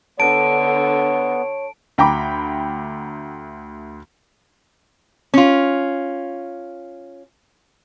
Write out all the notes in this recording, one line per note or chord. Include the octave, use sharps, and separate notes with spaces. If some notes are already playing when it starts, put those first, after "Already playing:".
D3 B3 C#5 A5 D7
D2 G5 A#5 B5 D6
C#4 F4